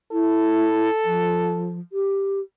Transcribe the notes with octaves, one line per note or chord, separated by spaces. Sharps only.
E4 A4
F3
G4